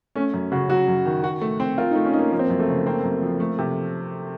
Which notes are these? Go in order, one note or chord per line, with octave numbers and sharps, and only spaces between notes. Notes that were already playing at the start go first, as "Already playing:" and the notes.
A3 C#4
F#2
C#3 F#4
F#3 F#4
F#2
D#3
F#4
A3
C4
F4 A#4
D#4
A3
C#4
D#4
A#3
F3 A#3
C4
A#3
F#2
A3
C#3
A#3 C4
F#2
F3
A3
C3